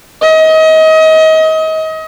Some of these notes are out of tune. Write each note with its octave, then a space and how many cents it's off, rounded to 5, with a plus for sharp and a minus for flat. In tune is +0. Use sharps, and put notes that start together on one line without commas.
D#5 +30